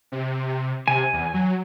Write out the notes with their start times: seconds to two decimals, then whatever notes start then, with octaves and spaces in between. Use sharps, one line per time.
0.12 C3
0.88 C3 G#5
1.13 E2
1.34 F#3